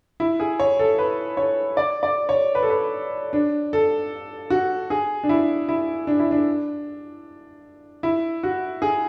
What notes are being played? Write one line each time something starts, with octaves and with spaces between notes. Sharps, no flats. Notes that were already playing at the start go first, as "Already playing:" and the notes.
E4
G#4
C#5
A4
B4
C#5
D5
D5
C#5
B4
A4
B4
D4
A4
F#4
G#4
D4
E4
E4
D4
E4
D4
E4
F#4
G#4